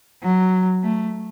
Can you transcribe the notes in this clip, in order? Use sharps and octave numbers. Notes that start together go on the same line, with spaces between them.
F#3
A3